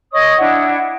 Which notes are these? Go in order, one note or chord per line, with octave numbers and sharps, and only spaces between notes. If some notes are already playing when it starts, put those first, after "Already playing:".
C#5 D#5 C#6 D#6
D4 E4 F#5